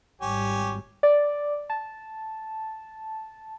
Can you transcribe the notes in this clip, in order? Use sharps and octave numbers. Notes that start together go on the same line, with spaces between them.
G#1 G3 G4 C#5 G#5
D5
A5